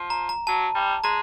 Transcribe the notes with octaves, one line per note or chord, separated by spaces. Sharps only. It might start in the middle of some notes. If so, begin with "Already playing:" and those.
Already playing: F3
A#5
A#5
F#3 A5
G3
G#3 A#5